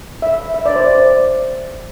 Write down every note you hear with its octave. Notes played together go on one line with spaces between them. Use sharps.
E5
E5
D5
C5
D5